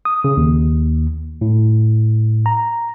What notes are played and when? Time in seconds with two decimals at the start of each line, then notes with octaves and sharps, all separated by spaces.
0.05 D#6
0.24 C#3
0.37 D#2
1.41 A2
2.46 A#5